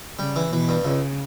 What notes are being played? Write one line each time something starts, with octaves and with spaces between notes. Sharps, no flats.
C#3 G3
E3
B2 E3
G2
C#2 C#3